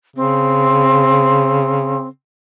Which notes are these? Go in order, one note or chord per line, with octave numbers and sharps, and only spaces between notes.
C#3 C4